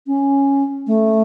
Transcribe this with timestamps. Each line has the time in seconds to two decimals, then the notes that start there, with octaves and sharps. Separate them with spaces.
0.07 C#4
0.87 A3